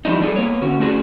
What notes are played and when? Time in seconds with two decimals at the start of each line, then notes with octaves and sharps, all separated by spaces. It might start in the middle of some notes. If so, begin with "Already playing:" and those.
0.05 E3 F3 G3 D4 D#4
0.20 G3 D4 E4 F4 G#4 A4
0.36 A#3 B3 C#5
0.61 D3 C#4 F#4
0.79 A3 C#4 D4 F#4 G#4